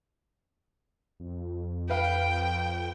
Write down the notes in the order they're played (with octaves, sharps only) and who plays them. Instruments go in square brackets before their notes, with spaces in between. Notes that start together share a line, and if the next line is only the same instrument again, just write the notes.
[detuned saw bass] F2
[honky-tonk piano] B4 F5 [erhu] G5